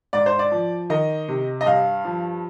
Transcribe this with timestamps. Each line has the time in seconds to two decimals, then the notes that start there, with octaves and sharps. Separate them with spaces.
0.13 G#2 D5
0.26 C5
0.39 D5
0.52 F3
0.90 D#3 D#5
1.28 C3
1.61 D#5
1.66 G2 F5
2.05 F3